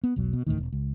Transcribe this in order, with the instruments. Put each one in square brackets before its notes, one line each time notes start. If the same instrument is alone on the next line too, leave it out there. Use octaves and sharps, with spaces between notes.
[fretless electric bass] B3
E1 B1 F#3
B2
D1 D2 A2 D#3
E1
C#2